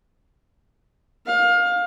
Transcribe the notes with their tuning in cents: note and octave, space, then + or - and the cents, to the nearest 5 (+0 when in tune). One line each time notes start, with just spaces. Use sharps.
F5 +25